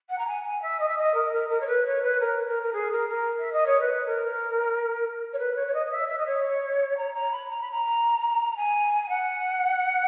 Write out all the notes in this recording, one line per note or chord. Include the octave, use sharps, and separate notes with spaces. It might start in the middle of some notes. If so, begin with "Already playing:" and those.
F#5
A#5
G#5
G#5
E5
D#5
E5
D#5
A#4
A#4
A#4
C#5
B4
C#5
B4
A#4
A#4
A#4
G#4
A#4
A#4
E5
D#5
C#5
B4
A#4
C#5
B4
C#5
C#5
D#5
D#5
E5
E5
D#5
C#5
A#5
A#5
B5
A#5
B5
A#5
G#5
F#5